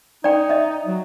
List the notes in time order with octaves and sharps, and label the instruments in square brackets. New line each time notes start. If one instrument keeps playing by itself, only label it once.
[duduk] D#4 [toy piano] D5 G5
[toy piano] D#5 E5
[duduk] F#3